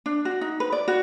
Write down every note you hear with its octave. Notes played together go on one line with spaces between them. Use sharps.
D4
F#4
D#4
B4
D5
F#4